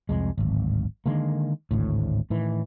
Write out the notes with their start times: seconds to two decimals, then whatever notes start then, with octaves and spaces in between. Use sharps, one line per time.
0.09 C2 F2 G#3
0.38 D1 G#1
1.06 D3 D#3 G#3 A#3
1.71 G#1 D2 A2
2.30 A2 D#3 E3